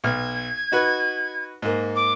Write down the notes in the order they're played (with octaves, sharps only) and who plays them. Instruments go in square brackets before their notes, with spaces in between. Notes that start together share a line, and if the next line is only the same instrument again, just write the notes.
[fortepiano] B1 F6 [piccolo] G#6
[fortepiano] D#4 F#4 B4
G#2 A#3
[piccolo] D6